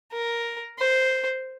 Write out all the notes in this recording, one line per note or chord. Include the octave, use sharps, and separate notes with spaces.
A#4
C5